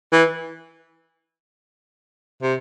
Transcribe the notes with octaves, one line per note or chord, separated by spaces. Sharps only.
E3
C3